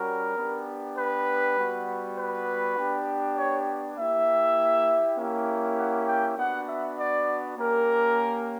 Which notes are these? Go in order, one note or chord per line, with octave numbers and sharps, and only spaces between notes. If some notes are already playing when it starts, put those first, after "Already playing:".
Already playing: G3 C#4 F#4 A#4
B3 D4 G4
B4
G3 B3 F#4
B4
B3 D4 G4
C#5
A#3 E4 G4 E5
A#3 C#4 E4 G4
F#5
G5
B3 D4 F#4 F#5
E5
D5
A#3 C#4 G4 A#4